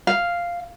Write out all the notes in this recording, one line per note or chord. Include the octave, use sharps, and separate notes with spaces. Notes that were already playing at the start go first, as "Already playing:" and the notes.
F5